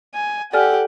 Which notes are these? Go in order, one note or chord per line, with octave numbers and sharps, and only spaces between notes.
G#5
G4 A4 D5 F#5 G#5 F6